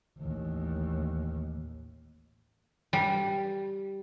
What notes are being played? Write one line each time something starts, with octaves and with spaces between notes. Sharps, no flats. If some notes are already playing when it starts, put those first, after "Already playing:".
A1 D#2
G3